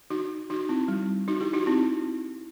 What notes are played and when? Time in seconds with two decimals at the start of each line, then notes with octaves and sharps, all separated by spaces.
0.10 D#4 F#4
0.50 D#4 F#4
0.69 C4 E4
0.88 G3
1.28 D#4 F#4
1.40 E4 G4
1.53 D#4 F#4
1.66 C4 E4